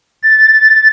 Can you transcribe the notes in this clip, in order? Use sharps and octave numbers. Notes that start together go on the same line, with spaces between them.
A6